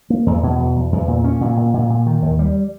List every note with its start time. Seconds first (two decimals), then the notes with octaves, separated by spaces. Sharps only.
0.10 A#3
0.26 E2
0.43 B2
0.59 E2
0.76 E2
0.92 E2
1.08 A#2
1.24 C#4
1.41 A#2
1.57 A#2
1.74 A#2
1.90 A#2
2.06 D#3
2.22 D#2
2.39 G3